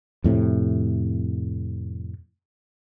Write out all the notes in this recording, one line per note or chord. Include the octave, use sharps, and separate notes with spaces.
F2 A2 C3